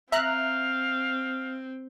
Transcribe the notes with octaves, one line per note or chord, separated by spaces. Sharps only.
C4 E5 F5 A#5 F#6